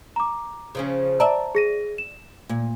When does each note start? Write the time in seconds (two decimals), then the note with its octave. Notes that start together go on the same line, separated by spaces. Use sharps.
0.16 A#5 D6
0.75 C#3 F3 C#4
1.20 D5 E5 A5 A#5
1.55 G#4 A#6 D#7
1.98 E7
2.49 A#2